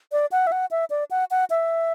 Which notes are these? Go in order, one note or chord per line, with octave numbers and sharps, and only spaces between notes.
D5
F#5
E5
F#5
E5
D5
F#5
F#5
E5